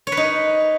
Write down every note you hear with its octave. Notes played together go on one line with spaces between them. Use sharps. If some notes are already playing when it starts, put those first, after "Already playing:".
C#5
B4
D#4